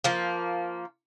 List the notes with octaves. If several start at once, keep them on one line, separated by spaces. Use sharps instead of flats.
F3 A#3